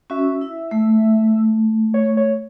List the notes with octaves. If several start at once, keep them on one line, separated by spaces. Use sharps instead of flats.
C#4 F#4 E5
E4
A3
C#5
C#5